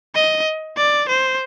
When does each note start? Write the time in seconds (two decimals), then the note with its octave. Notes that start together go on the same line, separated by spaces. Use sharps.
0.15 D#5
0.77 D5
1.09 C5